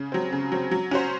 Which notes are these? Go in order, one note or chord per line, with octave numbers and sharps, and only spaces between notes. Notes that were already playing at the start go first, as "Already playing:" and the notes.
Already playing: C#3
F#3 C4
C#3
F#3 C4
F#3
C#4 F#4 C5